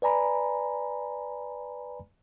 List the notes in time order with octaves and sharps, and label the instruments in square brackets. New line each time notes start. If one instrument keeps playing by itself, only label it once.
[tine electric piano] B4 D5 G#5 A#5 B5